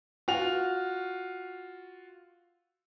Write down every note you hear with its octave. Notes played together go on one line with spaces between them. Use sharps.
F4 F#4 F7